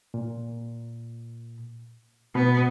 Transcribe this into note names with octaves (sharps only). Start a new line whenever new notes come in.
A#2
B2 B3 B5